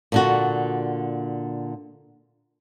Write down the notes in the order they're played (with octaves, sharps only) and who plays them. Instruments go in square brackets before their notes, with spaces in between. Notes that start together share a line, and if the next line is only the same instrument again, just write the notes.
[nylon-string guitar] A#2 D3 F#4